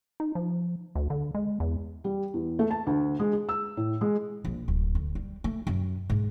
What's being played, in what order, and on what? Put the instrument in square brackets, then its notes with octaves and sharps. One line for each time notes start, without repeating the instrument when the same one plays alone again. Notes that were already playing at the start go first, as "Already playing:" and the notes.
[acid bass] D#4
F3
D2
D3
G#3
E2
[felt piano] G3
E2
A3
A5
D2
G#3
G#4
E6
A2
G#3
[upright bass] A#1
D1
D2
G3
A3
F#2
G#2